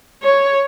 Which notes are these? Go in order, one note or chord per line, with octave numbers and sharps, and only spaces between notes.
C#5